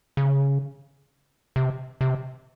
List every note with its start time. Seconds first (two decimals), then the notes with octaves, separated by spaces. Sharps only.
0.17 C#3
1.56 C3
2.01 C3